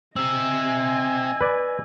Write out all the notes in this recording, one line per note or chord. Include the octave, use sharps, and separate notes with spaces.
C4 D#5 E5 G#5 E6
B4 D5